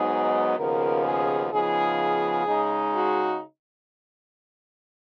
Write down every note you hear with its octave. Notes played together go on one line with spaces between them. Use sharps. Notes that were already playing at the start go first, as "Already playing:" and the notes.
Already playing: G#2 F#3 B3 D#4 G#4
D#2 C#3 F3 B3 A#4
G#4
C#3 F3 B3 D#4 G#4
C#3 G#3 D#4
F#4